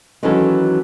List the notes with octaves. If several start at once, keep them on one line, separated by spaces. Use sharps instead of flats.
D#3 E3 F#3 G#3 C#4 A4